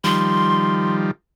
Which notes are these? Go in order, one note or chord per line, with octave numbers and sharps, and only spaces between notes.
D#3 F3 G3 C6